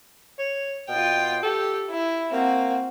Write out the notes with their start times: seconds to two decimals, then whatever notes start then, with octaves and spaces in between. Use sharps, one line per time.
0.39 C#5
0.89 B2 F4 G5
1.43 G4 A4
1.90 E4
2.32 A#3 C4 F#4